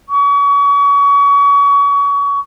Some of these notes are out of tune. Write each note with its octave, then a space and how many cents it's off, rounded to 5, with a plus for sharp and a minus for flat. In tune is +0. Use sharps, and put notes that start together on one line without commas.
C#6 +35